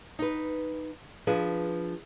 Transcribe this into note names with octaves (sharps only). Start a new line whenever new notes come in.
D#4 B4
F3 D4 G#4 B4